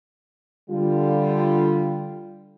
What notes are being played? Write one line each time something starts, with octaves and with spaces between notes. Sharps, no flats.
D3 G3 F4